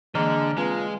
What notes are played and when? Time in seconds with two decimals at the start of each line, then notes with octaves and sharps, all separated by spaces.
0.15 D3 E3 G#3 A#3 D#5 A#5 F6
0.57 G#3 C4 F4 B4